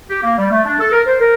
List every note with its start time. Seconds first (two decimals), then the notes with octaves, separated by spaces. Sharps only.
0.10 G4
0.23 A#3
0.38 G3
0.51 A3
0.66 D4
0.79 A4
0.92 A#4
1.07 C5
1.20 A#4